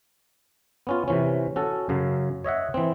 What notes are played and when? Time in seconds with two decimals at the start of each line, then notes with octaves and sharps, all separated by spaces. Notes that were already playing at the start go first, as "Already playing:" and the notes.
0.87 B3 C#4 F4
1.08 C3 E3 C#4
1.56 C#4 F#4 A4
1.89 F#2 C#3 F#3
2.44 C#5 D#5 E5 F#5
2.74 E3 C4